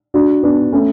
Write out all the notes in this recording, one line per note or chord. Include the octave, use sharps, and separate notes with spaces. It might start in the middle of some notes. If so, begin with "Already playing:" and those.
D4 F#4
B3 D4
A3 C#4